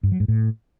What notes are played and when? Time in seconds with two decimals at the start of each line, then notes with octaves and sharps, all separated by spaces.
0.03 G2
0.12 F#3
0.20 G#2
0.28 A2